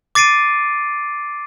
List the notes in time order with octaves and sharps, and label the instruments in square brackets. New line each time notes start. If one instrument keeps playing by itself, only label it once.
[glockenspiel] D6 A6 C7 D7 D#7